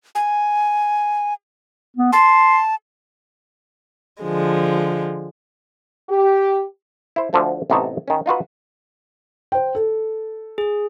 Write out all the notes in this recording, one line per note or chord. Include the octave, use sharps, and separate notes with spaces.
G#5
B3
A5 C6
D3 F3 G#3
G4
E4 C5
D2 D3 F3 A3
A1 C3 B3 D#4 C#5 A5
D#3 C#4
D#4 F4 F#4 B4
C5 G5
A4
G#4